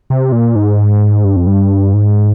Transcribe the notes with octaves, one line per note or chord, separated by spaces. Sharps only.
C3
A#2
G#2
G2
F2
G2
G#2